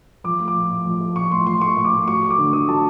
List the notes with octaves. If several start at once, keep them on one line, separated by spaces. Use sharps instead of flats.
F3 D6
A3
D6
A2
A2
F3
A3
A2 C#6
A2 C6
F3 C6
A3 C#6
A2
D6
A2
F#3 C#6
A3
D6
D3
D3 D#6
F#3 A5